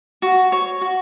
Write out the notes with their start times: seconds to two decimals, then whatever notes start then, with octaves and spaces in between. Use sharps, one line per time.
0.22 F#4
0.52 C#5
0.81 F#4